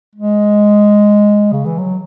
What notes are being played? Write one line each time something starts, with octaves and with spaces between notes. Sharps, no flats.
G#3
C#3
E3
F#3